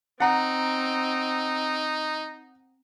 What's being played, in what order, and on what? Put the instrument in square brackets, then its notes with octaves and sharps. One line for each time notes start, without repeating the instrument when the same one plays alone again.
[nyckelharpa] C4 [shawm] D#4 [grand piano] F#5 A#5